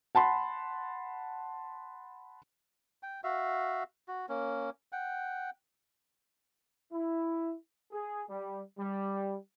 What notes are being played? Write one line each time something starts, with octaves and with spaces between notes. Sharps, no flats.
F#5 A5 B5 C6
G5
F#4 E5 F5
F#4
A#3 C#4
F#5 G5
E4
G#4
G3
G3